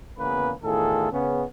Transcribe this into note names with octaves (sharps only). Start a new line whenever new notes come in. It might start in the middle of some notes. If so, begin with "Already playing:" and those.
E2 C#3 A#3 B3 G#4 B4
E2 A2 D#3 F4 G#4 A4
C#3 B3 C#4